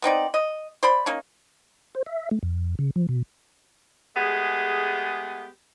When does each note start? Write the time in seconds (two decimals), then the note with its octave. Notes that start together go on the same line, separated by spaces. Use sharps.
0.02 B3 C4 D#4 D5
0.34 D#5
0.83 C5 D5 B5
1.06 A#3 C#4 D#4
1.95 C5
2.06 E5
2.31 A3
2.43 F2
2.79 C#3
2.96 F3
3.09 B2
4.16 G#3 A3 B3 G4 G#4